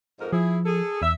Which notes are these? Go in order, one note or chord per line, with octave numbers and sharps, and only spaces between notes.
F2 G#2 A#4
F3 E4 G#4
G#4 A4
E2 E5